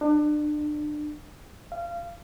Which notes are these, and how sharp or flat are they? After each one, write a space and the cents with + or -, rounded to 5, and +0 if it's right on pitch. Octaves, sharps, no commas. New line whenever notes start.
D4 +30
F5 -25